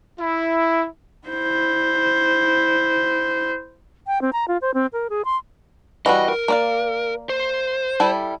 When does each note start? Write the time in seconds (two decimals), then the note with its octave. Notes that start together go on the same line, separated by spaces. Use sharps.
0.20 E4
1.28 E4 C5
4.07 G5
4.22 C4
4.33 A#5
4.48 F4
4.61 C5
4.74 C4
4.93 A#4
5.10 G#4
5.25 C6
6.06 E3 G3 F#4 D#5
6.28 A#4
6.48 A#3 D5 F5
7.29 C5
8.00 G3 E4 A4